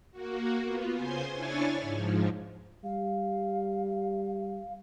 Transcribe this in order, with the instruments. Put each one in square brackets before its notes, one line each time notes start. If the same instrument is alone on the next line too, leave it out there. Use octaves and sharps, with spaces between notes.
[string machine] A#3 F#4
B3 F4
C#3 C5 G#5 C6
D4 E4 C#5 G#5 C#6 A6
G#2 F3
[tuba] G3 [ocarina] F5